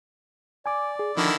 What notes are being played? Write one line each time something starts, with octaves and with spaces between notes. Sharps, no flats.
D5 G#5 D6
G#4
D3 D#3 F3 D4 E4